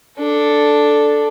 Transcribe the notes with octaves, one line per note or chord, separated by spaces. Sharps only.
D4 A4